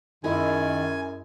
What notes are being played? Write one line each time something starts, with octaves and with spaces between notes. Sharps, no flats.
F#2 D#3 G#3 E4 G#5